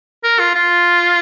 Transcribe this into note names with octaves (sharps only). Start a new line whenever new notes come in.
A#4
F4
F4